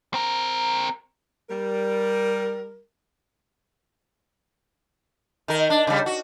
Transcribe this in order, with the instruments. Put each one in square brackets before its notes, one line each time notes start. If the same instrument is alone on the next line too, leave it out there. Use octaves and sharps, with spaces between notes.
[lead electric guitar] C4 A#4
[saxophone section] G3 A#4
[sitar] D#3 A#4
D4
C#3 G3
F#4